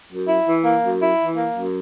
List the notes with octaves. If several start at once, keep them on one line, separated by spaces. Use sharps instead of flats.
F#2
E4
E3
A#3
F#2
E4
E3
A#3
F#2